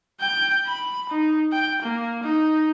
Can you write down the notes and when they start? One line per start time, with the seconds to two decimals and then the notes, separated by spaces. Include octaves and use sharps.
0.20 G5 G6
0.65 B5
1.09 D#4
1.52 G5
1.82 A#3
2.23 D#4